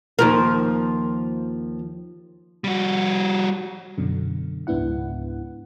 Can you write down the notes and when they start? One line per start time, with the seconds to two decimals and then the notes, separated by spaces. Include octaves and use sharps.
0.19 D#2 F3 A#4
2.64 G3 F#4
3.98 F#2 B2 D3
4.67 C#2 G#2 B3 D4 E4 F#5